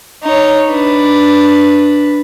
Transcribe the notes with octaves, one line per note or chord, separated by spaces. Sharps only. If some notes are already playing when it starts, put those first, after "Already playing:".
D#4 C#5
D4 B4